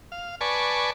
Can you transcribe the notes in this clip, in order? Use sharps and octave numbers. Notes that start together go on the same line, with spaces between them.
F5
B4 D5 G#5 A5 C#6